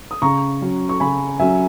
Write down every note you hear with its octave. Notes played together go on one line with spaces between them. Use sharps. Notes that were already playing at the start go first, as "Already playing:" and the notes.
D#6
C#3 A#5 C#6
F#3 C#4
C#6
C#3 G#5 B5
F#3 C#4 E5 G#5